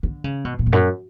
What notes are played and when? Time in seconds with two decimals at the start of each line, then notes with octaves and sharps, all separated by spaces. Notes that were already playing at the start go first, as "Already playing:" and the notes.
0.03 D3
0.24 C#3
0.45 B2
0.59 A#2
0.66 E2
0.72 F#2